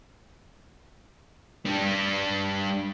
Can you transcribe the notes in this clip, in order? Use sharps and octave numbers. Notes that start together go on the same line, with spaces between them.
G3 D4